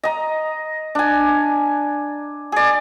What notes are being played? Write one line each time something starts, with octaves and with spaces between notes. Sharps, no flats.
D#5 A#5
D4 G#5
G#4 D5